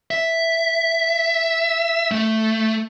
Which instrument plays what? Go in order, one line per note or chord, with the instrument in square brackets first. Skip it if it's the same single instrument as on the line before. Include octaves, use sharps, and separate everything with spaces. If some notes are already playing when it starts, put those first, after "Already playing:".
[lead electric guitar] E5
A3